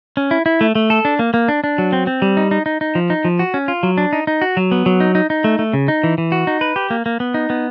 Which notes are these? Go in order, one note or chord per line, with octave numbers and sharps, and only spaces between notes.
C#4
E4
E4
A3
A3
A4
D4
A#3
A#3
D4
D4
F#3
C4
C4
G3
D#4
D#4
D#4
D#4
F3
D#4
F3
F#4
C#4
F4
F#3
D4
D#4
D#4
F#4
F#3
B3
F#3
D#4
D#4
D#4
A3
A3
C#3
D#4
E3
E3
F#4
D#4
B4
G4
A#3
A#3
B3
D#4
B3